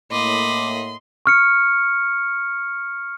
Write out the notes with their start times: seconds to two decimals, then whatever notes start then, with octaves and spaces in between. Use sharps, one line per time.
0.12 A2 A#3 D#5 B5 C6 D6
1.26 C#6 F6 C#7